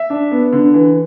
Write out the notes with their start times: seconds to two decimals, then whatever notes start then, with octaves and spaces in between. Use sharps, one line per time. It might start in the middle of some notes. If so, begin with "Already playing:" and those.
Already playing: E5
0.10 D4
0.31 B3
0.52 D3
0.74 E3